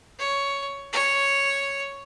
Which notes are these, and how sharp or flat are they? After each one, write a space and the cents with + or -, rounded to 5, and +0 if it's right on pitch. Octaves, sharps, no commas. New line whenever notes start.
C#5 +10
C#5 +0